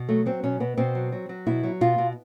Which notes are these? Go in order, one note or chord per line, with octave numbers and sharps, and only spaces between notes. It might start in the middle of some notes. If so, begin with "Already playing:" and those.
Already playing: B2
F#3 A3
F#3 C4
B2 C#4
B2 B3
B2 C4
F#3
F#3
F#3
B2 E4
F#3
B2 F4
B2